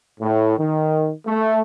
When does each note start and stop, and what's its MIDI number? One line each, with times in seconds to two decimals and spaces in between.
0.21 0.54 45
0.58 1.12 51
1.27 1.62 57